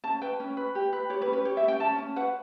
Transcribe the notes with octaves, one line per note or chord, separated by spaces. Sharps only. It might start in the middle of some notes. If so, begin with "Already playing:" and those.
C#4 A5
B4 G5
C#4
B4
G4
B4
G4 C#5
B4
C#4
B4
G4 C#5
E5
C#4 G5
C#4 A5
C#4
B4 F#5